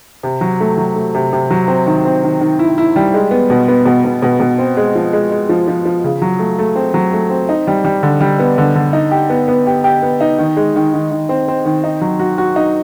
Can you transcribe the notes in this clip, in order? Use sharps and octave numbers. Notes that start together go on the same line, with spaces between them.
C3
F#3
A3
F#3
A3
C3
C3
F#3
C4
D#3
C4
D#3
D#3
E4
E4
G3
G#3
B3
B2
B3
B2
B2
B2
B2
C4
G#3
F3
G#3
G#3
F3
F3
F3
C#3
F#3
A3
A3
C4
F#3
A3
C4
D#4
G3
G3
D3
G3
B3
D3
D3
D#4
G4
B3
B3
G4
G4
B3
D#4
D#3
G#3
D#3
D#3
D#3
C4
C4
D#3
D#4
F#3
F#4
F#4
D#4